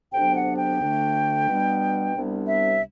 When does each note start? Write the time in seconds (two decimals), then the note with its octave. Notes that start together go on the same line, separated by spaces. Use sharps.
0.13 D2 C3 F#3 B3 D4 G5
0.36 F#5
0.58 G5
0.80 D2 D3 A3 D4
1.47 B2 G3 B3 D4
2.14 C2 C3 G3 B3 D4
2.47 E5